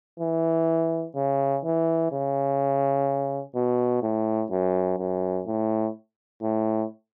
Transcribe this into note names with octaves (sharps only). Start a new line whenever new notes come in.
E3
C#3
E3
C#3
B2
A2
F#2
F#2
A2
A2